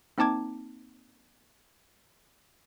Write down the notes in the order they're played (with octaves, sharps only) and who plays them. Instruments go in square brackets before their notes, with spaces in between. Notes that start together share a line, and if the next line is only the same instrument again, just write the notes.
[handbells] A#3 C4 D#4 A5 D6 G#6